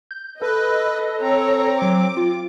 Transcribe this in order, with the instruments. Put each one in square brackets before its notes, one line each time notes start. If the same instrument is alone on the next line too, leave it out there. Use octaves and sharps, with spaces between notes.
[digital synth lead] G6
[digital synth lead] A4 [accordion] B4 [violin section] D#5
[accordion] C4 [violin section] C#5 A#5
[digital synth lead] F#3 [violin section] D6
[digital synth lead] F4